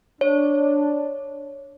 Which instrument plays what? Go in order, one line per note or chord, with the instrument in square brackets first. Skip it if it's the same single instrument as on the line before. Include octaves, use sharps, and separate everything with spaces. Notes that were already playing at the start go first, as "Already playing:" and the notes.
[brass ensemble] D4 [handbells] C#5